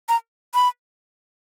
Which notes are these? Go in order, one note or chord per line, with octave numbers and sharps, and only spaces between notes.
A#5
B5